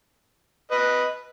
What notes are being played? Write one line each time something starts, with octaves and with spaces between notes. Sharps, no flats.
B4 D#5